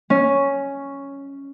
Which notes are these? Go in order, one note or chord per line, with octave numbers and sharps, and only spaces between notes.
C#4